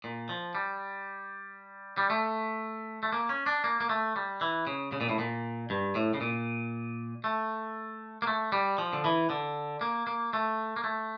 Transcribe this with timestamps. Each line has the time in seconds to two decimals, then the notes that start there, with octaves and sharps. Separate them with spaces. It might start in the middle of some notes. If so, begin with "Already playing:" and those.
0.04 A#2
0.29 F3
0.55 G3
1.98 G3
2.10 A3
3.03 A3
3.12 A#3
3.29 C#4
3.46 D4
3.64 A#3
3.80 A#3
3.89 A3
4.16 G3
4.41 E3
4.67 C#3
4.92 C#3
5.01 A#2
5.09 A2
5.19 A#2
5.70 G2
5.95 A2
6.14 C#3
6.21 A#2
7.24 A3
8.22 A#3
8.27 A3
8.52 G3
8.78 F3
8.93 D3
9.04 E3
9.30 D3
9.81 A#3
10.07 A#3
10.33 A3
10.76 A#3
10.84 A3